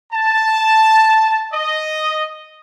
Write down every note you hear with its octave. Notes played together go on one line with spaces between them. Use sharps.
A5
D#5